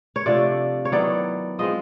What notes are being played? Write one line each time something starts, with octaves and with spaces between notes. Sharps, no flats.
C#5
C3 F3 A3 D4 D5
C#5
D#3 F#3 B3 E4 D5
F3 G#3 C4 D#5